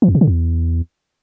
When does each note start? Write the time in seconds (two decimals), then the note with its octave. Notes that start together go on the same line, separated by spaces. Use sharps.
0.02 E3
0.08 E2
0.15 B2
0.21 C#3
0.27 E2